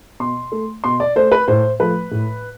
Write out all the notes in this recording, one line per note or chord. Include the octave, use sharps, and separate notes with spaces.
B2 C6
A3
B2 C6
D5
A3 C5
B4
A2 C5
F3 A3 B4
A2